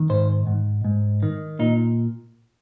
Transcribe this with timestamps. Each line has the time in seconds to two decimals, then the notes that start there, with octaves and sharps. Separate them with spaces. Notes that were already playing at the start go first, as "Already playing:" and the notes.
Already playing: D#3
0.09 G#2 C5
0.47 G#2
0.85 G#2
1.23 D#3
1.59 A#2 D#4